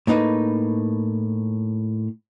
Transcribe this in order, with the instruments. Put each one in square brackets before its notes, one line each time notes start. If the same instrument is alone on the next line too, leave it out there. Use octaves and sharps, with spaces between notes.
[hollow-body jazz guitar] A2 A#3 D#4 B4